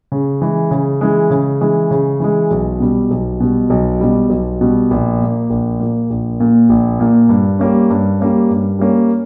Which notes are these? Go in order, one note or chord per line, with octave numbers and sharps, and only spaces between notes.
C#3
E3 G#3
C#3
E3 G#3
C#3
E3 G#3
C#3
E3 G#3
B1
B2 G3
B1
B2 G3
B1
B2 G3
B1
B2 G3
A#1
A#2 A#3
A#1
A#2 A#3
A#1
A#2 A#3
A#1
A#2 A#3
G2
G3 A#3 C#4
G2
G3 A#3 C#4
G2
G3 A#3 C#4